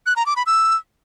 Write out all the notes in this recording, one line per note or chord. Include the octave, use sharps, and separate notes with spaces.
F#6
A#5
D6
B5
E6